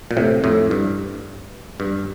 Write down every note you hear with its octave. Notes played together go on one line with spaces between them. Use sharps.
A#2
A2 C3
F2 A2
G2
G2